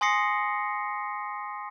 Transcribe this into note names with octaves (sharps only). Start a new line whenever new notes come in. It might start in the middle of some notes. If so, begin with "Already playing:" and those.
G#5 C6 D#6 A#6 C7 C#7